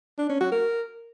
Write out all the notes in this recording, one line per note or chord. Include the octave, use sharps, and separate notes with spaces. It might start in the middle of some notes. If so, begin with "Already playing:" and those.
D4
C#4
F#4
A#4